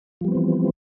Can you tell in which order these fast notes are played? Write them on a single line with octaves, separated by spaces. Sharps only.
F3 G3 B3 C4 E3